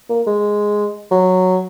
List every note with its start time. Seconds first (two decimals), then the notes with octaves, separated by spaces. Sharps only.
0.09 A#3
0.27 G#3
1.11 F#3